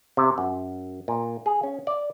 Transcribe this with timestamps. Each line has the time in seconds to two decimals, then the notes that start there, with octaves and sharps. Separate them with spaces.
0.17 C3
0.38 F#2
1.08 A#2
1.46 G#4
1.63 C#4
1.87 D5